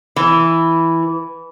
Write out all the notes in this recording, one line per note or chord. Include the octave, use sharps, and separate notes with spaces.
E3